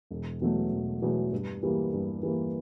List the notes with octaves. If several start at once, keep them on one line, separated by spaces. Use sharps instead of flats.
E1
E2 B2 F#3 A3
E1
E2 B2 F#3 A3
G2
E3 G3 A#3
G2
E3 G3 A#3